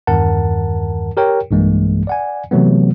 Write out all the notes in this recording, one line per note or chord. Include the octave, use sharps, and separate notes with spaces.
E2 G2 D#3 A#4 F#5 A5
G4 A#4 C#5 G5
B1 G2 E3 G#3 A#3
D5 F#5 G#5
C3 E3 F#3 A3 B3